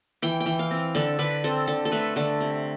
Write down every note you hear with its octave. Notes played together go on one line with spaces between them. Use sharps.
E3 G5
G5
E3
F5
C4
D3 A4
D3 B4
C4 A4
D3 A4
A4
A3 B4
D3 A4
C3